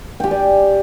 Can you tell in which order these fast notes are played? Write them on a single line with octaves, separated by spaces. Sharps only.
G5 G4 G#5 D5